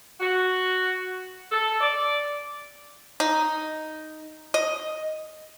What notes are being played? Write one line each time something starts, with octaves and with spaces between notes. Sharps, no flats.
F#4
A4
D5
D#4
D#5